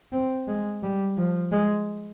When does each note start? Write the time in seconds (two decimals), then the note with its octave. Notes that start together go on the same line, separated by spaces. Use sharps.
0.12 C4
0.48 G#3
0.83 G3
1.17 F3
1.52 G#3